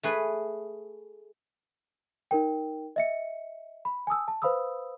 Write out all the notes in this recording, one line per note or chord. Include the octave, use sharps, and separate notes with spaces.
A3 G#4 B4
D#4 A#4 G5
D#5 E5 C#7
B5
G#5 A5 D#6 E6
A5
B4 C5 F5 B5 D#6 E6